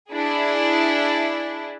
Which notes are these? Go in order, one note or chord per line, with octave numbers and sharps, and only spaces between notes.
D4 E4 G#4